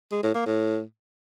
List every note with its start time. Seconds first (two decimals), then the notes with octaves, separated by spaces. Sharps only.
0.12 G#3
0.23 A2
0.34 A#3
0.46 A2